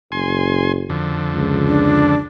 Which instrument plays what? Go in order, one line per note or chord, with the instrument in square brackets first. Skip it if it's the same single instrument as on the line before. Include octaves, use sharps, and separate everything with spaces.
[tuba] F#1 [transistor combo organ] G#5 C6
[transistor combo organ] F2 D3
[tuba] C#2
[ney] D4